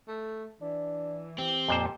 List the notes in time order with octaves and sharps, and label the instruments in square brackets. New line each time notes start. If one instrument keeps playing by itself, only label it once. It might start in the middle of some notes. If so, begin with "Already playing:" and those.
[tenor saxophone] A3
[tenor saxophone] E3 [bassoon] D4
[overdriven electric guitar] C4 [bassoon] G4
[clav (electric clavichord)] F2 A#2 C5